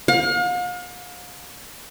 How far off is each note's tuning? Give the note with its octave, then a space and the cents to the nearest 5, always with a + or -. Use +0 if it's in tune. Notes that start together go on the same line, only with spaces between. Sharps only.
F5 +40